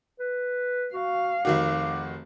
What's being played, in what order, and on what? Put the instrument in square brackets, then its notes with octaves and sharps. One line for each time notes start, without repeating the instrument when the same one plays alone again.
[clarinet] B4
[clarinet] F#4 [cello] F5
[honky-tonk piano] F1 D#3 F#4 [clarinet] D6